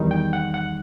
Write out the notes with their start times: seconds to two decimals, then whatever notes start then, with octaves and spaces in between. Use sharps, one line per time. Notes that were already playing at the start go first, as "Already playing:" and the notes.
Already playing: E2 D#3 G3 D#4
0.11 G5
0.33 F#5
0.54 F#5